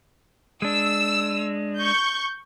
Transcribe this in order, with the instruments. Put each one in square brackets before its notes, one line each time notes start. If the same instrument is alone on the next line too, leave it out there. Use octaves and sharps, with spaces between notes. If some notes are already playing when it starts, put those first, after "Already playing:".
[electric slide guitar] G#3 D4 [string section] E6
[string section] C#6 G6